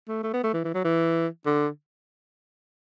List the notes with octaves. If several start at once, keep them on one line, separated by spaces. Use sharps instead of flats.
A3
A3
B3
A3
E3
E3
F#3
E3
D3